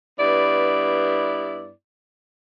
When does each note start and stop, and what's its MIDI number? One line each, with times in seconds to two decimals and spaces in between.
0.18 1.71 43
0.18 1.71 59
0.18 1.71 64
0.18 1.71 74